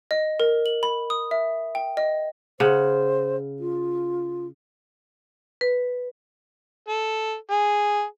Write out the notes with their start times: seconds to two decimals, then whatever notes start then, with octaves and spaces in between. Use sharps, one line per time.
0.11 D#5
0.40 A#4
0.66 F#7
0.83 B5
1.10 D#6
1.31 E5
1.75 G5
1.97 D#5
2.60 C#3 C5 F#5
3.60 F4
5.61 B4
6.88 A4
7.51 G#4